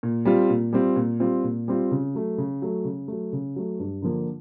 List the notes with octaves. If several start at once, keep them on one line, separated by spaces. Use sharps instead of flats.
A#2
G3 C4 F4
A#2
G3 C4 F4
A#2
G3 C4 F4
A#2
G3 C4 F4
C#3
F#3 A3
C#3
F#3 A3
C#3
F#3 A3
C#3
F#3 A3
G2
D3 F3 A#3 D4